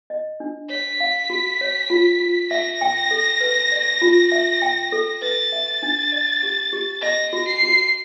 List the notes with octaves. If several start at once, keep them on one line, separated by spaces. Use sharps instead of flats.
D#5
D4
C#5 B6
F5
F#4
C#5
F4
F4
E5 A#6
G5
A4
B4
D5
F4
E5
G5
A4
B4 A6
E5
D4
D5
G4
G4
D#5 A#6
F#4
C7
F#4